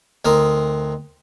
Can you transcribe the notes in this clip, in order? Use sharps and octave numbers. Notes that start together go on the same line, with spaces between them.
D2 C4 D#4 A#4 D#6